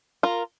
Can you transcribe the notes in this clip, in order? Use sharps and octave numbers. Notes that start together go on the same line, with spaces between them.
F4 A#4